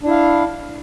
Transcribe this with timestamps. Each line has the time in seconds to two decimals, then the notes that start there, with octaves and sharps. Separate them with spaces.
0.03 D4
0.07 E4
0.10 F5